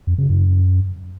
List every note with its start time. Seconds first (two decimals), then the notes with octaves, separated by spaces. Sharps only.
0.07 F2
0.18 C#3
0.29 F#2